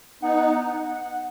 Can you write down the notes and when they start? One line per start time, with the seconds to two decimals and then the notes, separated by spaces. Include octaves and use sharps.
0.22 B3 D#4 F#5